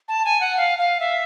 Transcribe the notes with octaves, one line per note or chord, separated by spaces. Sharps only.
A5
G#5
F#5
F5
F5
E5